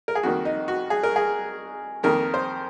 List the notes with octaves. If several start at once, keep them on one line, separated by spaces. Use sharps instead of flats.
A#4
G#4
F2 D#3 A#3 F#4
D#4
F#4
G#4
A#4
G#4
F2 D#3 A#3 A#4
C5